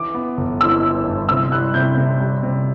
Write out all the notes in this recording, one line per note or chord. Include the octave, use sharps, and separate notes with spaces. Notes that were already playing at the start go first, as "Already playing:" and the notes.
Already playing: E3 D6
B3
G1
E3 E6
E3
G2
C3 E6
G3 F#6
C3 G6
C3
G3
C3